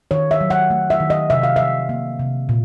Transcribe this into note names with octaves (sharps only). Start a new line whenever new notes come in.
D#3 C#5
E5
F#3
F#5
A3
E5
D#3
D#5
C3 E5
F5
F3 E5
A#3
C3
A#2